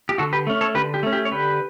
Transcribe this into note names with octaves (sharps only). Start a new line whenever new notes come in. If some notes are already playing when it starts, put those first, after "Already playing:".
G4
D3 F#4 A4
G4 B4
A3 C#4
A4 C#5
D3 G4 B4
G4
A3 C#4
G4
C#5
D3 G4 B4